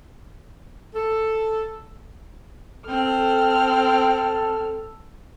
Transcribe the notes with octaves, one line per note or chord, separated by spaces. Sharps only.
A4
C4 A4 F6